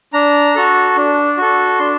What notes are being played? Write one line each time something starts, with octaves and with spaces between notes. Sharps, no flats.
D4 A#5
F#4 A4
D4
F#4 A4
D4 C6